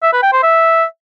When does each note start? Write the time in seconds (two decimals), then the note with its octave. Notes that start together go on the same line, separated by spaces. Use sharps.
0.03 E5
0.13 B4
0.23 G5
0.33 C5
0.43 E5